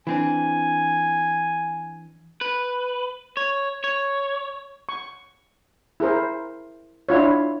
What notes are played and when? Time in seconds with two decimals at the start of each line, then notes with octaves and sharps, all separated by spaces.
0.07 E3 C4 D4 G#5
2.41 B4
3.37 C#5
3.84 C#5
4.89 C#6
6.00 E4 G#4 A#4 C5
7.09 D4 E4 F4 C#5